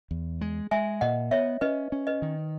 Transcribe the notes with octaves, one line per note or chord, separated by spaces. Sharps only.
E2
G#3
G#3 E5 G#5
A#2 D#5 F#5
B3 C#5 E5
C#4 B4 D#5
C#4
B4 D#5
D#3